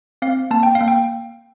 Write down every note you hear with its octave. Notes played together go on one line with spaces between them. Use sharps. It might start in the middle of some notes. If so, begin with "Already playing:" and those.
C4 F5
A#3 A5
G5
F5
A#3
G5